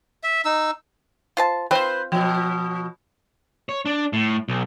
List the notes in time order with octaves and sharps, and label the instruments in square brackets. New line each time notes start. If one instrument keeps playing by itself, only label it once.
[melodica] E5
D#4 E6
[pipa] F4 C5 A5
[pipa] C4 F4 [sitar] B4 C5
[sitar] B2 F3
[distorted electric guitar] C#5
D4
A2
B1